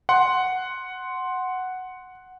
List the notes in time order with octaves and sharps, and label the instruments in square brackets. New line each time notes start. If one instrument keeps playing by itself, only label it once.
[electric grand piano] F#5 C6